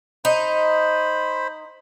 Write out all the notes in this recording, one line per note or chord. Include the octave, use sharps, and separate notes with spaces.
D#4 C5 B5